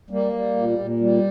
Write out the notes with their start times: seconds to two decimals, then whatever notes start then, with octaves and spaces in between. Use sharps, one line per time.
0.10 G3 A#3
0.33 G3
0.56 A#2
0.79 A#2
1.00 G3